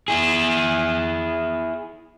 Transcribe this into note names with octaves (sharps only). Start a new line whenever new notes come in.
E4 G#4